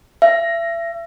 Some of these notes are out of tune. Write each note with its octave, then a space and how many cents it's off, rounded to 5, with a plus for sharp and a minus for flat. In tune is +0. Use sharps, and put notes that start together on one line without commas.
E5 +35